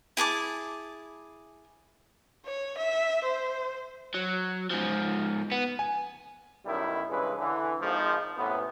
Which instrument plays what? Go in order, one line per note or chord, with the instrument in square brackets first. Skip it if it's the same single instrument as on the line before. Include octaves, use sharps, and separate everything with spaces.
[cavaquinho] E4 G#4 A5 D6
[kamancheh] C#5
E5
C5
[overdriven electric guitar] F#3
G#2 F3
B3
[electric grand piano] G#5
[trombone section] B1 F#2 D#3 G3 E4
G2 C#3 E3 G#3 B4
D3 E3
G#1 G#2 D#3 F3
A1 A2 C3 B3